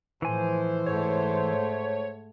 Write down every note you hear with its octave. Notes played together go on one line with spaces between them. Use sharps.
A2 E3 F3 C5 G#5
G#2 A3 C#5